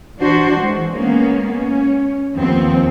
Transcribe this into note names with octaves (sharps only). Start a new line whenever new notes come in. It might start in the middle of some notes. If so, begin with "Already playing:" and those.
E3 D4 F#4 C5
E3 G#3
G#3 A#3 B3 C#4
C#4
D#2 F3 B3 C4